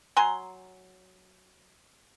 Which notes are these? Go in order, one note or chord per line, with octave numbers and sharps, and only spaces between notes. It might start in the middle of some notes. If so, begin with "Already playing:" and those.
F#3 G#5 A#5 C6